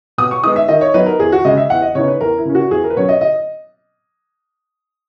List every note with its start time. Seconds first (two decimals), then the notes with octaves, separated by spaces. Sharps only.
0.18 B2 D#6
0.31 C#6
0.44 G#3 B3 D#4 D#6
0.56 E5
0.68 D#3 D#5
0.81 C#5
0.94 F#3 B3 D#4 B4
1.06 A#4
1.20 E2 G#4
1.32 F#4
1.45 C#3 G#3 D#5
1.57 E5
1.70 E2 F#5
1.82 D#5
1.95 C#3 E3 B3 D#4 C#5
2.08 B4
2.21 E2 A#4
2.37 E4
2.45 C#3 E3 A#3 C#4
2.55 F#4
2.70 E2 G#4
2.84 A#4
2.90 B4
2.97 B2 F#3 C#4 C#5
3.09 D#5
3.21 D#5